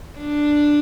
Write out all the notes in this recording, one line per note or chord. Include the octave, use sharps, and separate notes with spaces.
D4